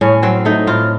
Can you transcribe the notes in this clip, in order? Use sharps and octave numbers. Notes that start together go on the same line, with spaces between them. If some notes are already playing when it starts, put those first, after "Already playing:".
A2 C#4
F#3 C4
A3 D#4
A2 F4